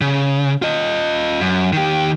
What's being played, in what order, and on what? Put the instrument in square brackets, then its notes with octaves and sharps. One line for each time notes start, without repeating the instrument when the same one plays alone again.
[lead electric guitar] C#3
F4 D#5
F#2
D#3 G4